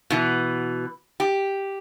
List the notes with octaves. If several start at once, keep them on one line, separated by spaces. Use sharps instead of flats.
B2 E3
G4